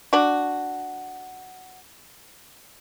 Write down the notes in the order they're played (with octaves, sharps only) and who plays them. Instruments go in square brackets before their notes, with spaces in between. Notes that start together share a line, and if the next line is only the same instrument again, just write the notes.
[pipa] D4 F#4